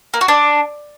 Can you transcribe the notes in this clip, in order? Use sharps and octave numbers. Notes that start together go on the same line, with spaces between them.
A#3
F#4
D4